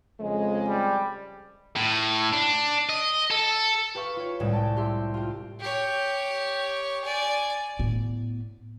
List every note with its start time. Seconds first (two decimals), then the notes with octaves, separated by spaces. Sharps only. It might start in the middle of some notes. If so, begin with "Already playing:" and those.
0.20 F2 C#3 G#3
0.68 G3
1.76 A2
2.33 D4
2.89 D#5
3.31 A4
3.95 G4 B4 F5 C#6
4.17 F4 C#5
4.40 C2 A2 G#3 G#6 E7
4.53 G5 A5
4.76 G4 E5 C6
5.14 F4 G4
5.60 G4 C#5
7.05 D5 G#5
7.79 A2 B3